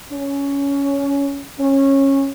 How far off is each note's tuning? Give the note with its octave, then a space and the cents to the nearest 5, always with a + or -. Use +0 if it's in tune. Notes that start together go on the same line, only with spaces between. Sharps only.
C#4 +15
C#4 -20